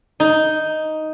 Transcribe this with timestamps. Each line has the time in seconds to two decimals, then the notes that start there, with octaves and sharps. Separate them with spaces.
0.20 D#4